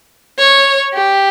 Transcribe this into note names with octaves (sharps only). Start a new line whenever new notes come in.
C#5
G4